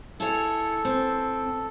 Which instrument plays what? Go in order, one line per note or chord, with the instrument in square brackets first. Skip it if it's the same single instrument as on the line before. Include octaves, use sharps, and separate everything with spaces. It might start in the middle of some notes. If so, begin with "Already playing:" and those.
[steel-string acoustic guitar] E4 G#4 C#5 [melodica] A4
[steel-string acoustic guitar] C4